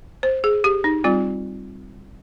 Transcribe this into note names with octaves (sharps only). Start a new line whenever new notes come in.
C5
G#4
G4
D#4
G3 C4 F4